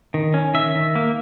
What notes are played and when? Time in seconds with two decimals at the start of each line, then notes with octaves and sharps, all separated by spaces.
0.14 D#3
0.34 C#4
0.54 D#3 E5
0.75 D#3
0.95 A#3